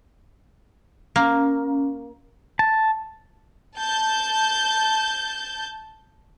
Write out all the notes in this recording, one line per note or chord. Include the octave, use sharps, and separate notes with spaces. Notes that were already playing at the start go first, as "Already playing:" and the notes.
A#3 C#4
A5
A5 G6